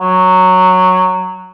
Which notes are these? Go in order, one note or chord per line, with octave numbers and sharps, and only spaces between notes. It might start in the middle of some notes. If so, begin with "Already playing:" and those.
F#3